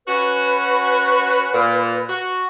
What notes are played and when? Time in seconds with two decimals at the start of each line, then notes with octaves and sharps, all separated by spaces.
0.07 C#4 F#4 B4
1.53 A#2
2.09 F#4